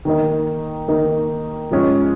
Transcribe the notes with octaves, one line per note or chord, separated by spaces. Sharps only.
D#3 A#3 D#4
D#3 A#3 D#4
G#2 F3 G#3 C#4